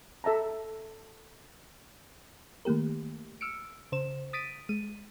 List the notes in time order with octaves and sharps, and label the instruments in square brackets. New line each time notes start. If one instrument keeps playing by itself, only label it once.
[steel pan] A4 E5 A5 A#5
[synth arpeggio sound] D#3 A3 A#3 G4 A#4
E6 F6 C#7 D7
C#3 C5 E7
D#6 A6 B6 D7 D#7
G#3 D#7